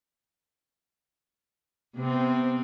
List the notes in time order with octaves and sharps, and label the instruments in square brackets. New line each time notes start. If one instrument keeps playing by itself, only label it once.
[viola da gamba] C3 B3 C4